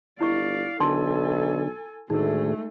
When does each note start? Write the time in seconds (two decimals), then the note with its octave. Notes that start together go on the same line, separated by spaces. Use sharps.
0.21 G1 E4 D5 D#5 F5 C#6
0.80 B1 D3 D4 A4 A#4 G#5 A5 C6
2.10 D2 A2 D#3 G#3 A3 D#4 G#4 A#4